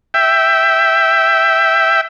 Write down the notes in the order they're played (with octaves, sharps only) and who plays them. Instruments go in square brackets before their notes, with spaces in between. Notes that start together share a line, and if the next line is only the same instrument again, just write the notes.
[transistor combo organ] E5 G5